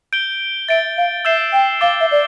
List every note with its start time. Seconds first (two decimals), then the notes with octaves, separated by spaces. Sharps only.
0.13 G6 D7 G7
0.69 E5 A6 D7 G7
0.97 F5
1.25 E5 E6 G6 C7 E7 G7
1.53 G5
1.81 F5 D6 A6 E7 G7
2.00 E5
2.11 D5